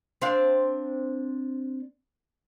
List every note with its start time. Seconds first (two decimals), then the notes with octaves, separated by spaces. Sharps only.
0.22 C4 D4 F5